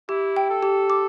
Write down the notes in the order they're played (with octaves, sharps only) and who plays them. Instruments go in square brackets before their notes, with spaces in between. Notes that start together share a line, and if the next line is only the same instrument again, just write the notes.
[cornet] E4 [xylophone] G4
[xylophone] G5
[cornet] A4
[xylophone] G4
D6